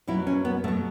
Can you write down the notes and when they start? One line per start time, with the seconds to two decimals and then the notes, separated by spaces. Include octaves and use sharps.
0.07 B2 F#3 E4
0.27 C#4
0.45 B3
0.64 B2 A3
0.68 F#3